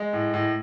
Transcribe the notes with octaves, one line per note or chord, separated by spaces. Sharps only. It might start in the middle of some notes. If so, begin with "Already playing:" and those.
Already playing: G#3
A2
A2